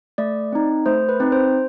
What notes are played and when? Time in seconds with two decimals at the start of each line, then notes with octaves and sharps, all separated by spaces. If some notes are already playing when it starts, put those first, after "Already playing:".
0.18 A3 D5
0.52 C4 D#4
0.86 A3 C5
1.09 B4
1.20 C4 D#4
1.32 C5